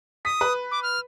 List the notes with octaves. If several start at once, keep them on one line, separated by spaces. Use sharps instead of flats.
D#6 B6
B4
D6
F6